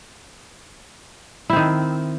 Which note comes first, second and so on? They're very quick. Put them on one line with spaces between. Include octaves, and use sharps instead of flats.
E4 C4 D#3